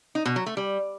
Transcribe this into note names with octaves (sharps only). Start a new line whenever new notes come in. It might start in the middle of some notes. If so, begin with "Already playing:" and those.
D#4
B2
F#3
A3
G3